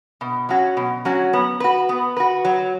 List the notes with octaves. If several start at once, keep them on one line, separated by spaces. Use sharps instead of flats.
B2
F#3 C#4 F#4
B2
F#3 C#4 F#4
B3
F#4 B4
B3
F#4 B4
F#3